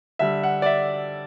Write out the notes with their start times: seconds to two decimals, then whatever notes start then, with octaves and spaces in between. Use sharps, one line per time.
0.19 D3 G3 E5
0.43 F#5
0.62 D5
0.66 E5